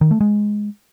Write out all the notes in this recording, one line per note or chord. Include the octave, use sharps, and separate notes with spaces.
D#3
A3
G#3